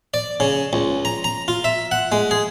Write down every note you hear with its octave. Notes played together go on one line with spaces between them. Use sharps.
D5
C#3
C#2
A#5
A#5
F4
E5
F#5
G#3
G#4